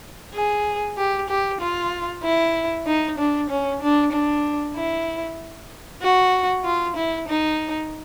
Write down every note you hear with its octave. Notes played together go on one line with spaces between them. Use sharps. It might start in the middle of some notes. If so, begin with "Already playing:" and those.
G#4
G4
G4
F4
E4
D#4
D4
C#4
D4
D4
E4
F#4
F4
E4
D#4